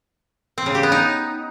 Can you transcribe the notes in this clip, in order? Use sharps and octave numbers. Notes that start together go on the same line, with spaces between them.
C4
C#3
G4
B3
D#4